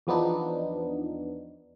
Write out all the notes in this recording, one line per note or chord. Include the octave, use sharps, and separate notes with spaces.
E2 F3 B3 D4 D#4